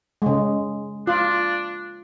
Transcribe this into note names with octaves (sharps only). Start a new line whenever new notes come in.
C#3 G#3
D4 F4